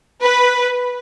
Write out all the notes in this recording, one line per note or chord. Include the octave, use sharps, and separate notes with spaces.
B4